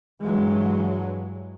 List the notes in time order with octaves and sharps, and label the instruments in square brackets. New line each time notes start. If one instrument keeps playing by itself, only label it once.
[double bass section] G2 E3 F#3 G#3